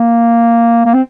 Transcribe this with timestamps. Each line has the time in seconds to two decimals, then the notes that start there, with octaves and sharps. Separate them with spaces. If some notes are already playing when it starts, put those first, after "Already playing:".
Already playing: A#3
0.85 A#3
0.94 C4